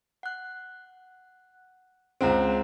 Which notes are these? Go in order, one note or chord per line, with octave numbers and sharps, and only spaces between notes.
F#5 F#6
C#2 G#3 C4 C5 F#5 A#5